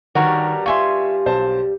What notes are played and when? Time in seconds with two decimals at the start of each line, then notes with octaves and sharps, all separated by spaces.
0.15 G2 D#3 G3 F#4 A#4 C#5
0.66 F4 E5 G#5 C6 C#6
1.26 B1 C5 A5